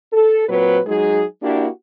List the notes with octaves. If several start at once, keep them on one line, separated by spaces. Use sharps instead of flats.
A4
A#2 F#3 C4 B4
F#3 G#3 D#4 G#4
A#3 D4 E4 F#4 G4